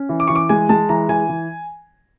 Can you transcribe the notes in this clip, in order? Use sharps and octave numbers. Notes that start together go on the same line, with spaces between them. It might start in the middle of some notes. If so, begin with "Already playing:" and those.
Already playing: C#4
E3
D6
E3 C#6
D6
G#3 G#5
G#3 A5
E3 A#5
E3 G#5
E3